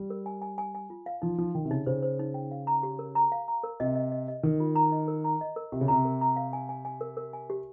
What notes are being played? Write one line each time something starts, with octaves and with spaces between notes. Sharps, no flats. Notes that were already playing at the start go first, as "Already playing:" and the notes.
Already playing: G3
A#4
G#5
G#5
G#5
G#5
F4
F5
F3 D#4
F3 D#4
D#3 G5
C3
C#3 D#4
C#3 C5
C5
D#4
G5
F5
A#5
G4
A#4
A#5
F5
A#5
A#4
C3 D#5
D#5
D#5
D#5
D#3 A#4
F4
A#5
D#5
A#4
A#5
D#5
A#4
C3 G4
C#3
C3 A#5
A#4
A#5
F5
G#5
G#5
G#5
A#4
A#4
G#5
G4